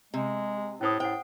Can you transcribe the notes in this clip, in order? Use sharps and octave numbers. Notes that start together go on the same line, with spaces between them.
C3 G#3
A2 C#4 C5 D#6
A2 C5 F#5 G5